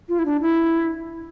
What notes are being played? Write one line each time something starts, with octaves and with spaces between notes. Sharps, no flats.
F4
E4
D4
E4